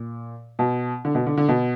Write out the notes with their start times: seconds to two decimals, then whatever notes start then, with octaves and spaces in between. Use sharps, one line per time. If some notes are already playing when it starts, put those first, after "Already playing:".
Already playing: A#2
0.59 B2
1.05 D3
1.15 B2
1.27 D3
1.37 D3
1.48 B2